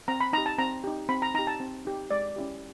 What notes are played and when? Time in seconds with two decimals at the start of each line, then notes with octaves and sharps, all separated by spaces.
0.08 C4 A#5
0.20 B5
0.33 D#4 A#5
0.38 G4
0.46 A5
0.58 C4 A#5
0.84 D#4 G4
1.09 C4 B5
1.22 A#5
1.34 D#4 A#5
1.39 G4
1.47 A5
1.60 C4
1.85 D#4 G4
2.11 G#3 D5
2.36 C#4 E4 G4